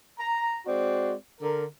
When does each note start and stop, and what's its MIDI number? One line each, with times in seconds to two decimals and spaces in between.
0.18 0.59 82
0.66 1.14 56
0.66 1.14 60
0.66 1.14 66
0.66 1.14 74
1.41 1.63 50
1.41 1.63 70